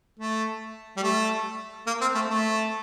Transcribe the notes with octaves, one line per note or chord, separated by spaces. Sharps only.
A3
G3
A3
A#3
C4
A3
A3